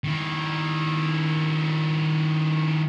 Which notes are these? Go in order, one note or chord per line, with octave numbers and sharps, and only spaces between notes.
D#3 E4